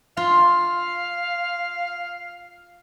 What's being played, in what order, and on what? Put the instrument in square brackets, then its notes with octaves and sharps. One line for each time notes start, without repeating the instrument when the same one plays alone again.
[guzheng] F4 [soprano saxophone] F5